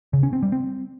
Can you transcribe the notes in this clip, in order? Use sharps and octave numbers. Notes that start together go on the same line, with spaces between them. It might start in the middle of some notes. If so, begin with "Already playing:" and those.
C#3
C#4
C4
G3
C4